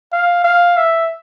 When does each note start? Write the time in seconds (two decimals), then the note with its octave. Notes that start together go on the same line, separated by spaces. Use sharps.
0.12 F5
0.44 F5
0.77 E5